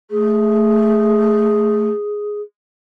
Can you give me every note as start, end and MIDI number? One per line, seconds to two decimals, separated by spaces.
0.11 1.88 57
0.11 2.41 68